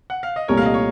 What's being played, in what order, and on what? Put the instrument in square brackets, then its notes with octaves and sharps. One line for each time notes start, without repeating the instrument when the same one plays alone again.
[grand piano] F#5
F5
D#5
[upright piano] C2 A#2 A3 [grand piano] A#4 C#5
[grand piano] F5
D#5
C#5